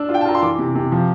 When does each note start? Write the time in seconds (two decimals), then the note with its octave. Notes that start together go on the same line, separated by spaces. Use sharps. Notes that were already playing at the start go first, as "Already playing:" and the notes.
Already playing: D4 E6
0.09 F4
0.14 G5
0.21 A5
0.25 F4 A#5
0.35 C6
0.42 E3 D6
0.59 C3
0.75 C3
0.92 F3